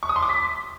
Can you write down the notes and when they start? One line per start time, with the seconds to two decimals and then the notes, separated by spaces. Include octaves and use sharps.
0.03 C#6
0.09 D#6
0.16 C6
0.23 D6
0.29 B6